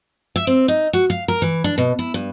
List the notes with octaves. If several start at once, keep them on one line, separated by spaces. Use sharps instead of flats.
E5
C4
D#4
F#4
F5
A#4
E3
D4
B2
E4
G2